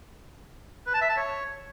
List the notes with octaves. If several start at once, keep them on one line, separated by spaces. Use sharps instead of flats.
B4
A5
E5
A5
C#5